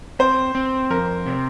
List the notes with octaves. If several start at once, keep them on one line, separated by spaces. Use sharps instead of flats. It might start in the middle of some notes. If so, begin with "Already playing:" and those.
C4 C5
C4
F2 A#4
C3